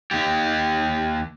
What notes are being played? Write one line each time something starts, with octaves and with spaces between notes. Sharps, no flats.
D#2 G4